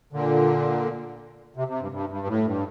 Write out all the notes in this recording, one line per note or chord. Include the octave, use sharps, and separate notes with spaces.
A#2 D3
C3
C3
G2
G2
G2
A2
G2